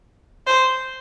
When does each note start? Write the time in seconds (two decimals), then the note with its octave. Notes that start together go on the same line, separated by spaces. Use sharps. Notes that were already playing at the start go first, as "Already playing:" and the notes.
0.47 C5